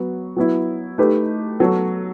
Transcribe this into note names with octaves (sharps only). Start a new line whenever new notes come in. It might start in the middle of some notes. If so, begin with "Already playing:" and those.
Already playing: F#3 B3 F#4
F#3 B3 E4
A3 D#4 G4 B4
F#3 B3 F#4 A4